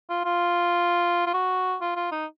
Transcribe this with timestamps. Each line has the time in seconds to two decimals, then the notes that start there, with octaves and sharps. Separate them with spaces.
0.10 F4
0.25 F4
1.26 F4
1.34 F#4
1.81 F4
1.96 F4
2.11 D#4